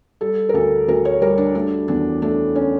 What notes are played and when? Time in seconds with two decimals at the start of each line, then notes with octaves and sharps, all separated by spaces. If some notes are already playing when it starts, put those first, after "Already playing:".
0.21 G3 A4
0.49 A#4
0.54 D2 A4
0.88 D2 A#4
1.05 C#5
1.21 G3 A#4
1.38 D4
1.55 A3 D4
1.88 E2 D4
2.22 A3 D4
2.55 C#4